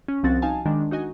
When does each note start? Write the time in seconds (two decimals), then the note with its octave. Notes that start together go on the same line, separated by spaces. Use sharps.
0.08 C#4
0.23 C2 F3 C4 F#4 A6
0.42 D#4 F5 G#5 A5
0.65 D#3 G#3 D4
0.91 D#4 F#4 D#5 G#5